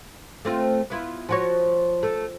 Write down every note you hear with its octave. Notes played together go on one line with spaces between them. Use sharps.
A3 C4 F4
B3 E4 F4
F3 F#4 C#5
A3